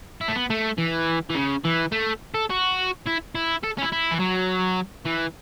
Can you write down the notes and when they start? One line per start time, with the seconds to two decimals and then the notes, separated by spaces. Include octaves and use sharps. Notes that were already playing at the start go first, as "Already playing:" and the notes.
0.21 E4
0.28 A3
0.35 B3
0.50 A3
0.78 E3
1.30 E3
1.35 C#3
1.64 E3
1.92 A3
2.35 A4
2.50 F#4
3.06 E4
3.35 E4
3.64 A4
3.79 C#4
3.83 E4
3.93 E4
4.12 E3
4.20 F#3
5.06 E3